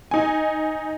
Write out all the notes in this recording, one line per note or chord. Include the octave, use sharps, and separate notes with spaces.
D#4 G#5